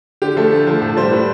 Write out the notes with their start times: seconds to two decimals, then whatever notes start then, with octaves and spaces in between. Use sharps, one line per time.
0.22 D3 G4
0.36 F3 A3
0.52 D3
0.67 F3 A3
0.81 A2 A4
0.97 G3 C5
1.12 A2 B4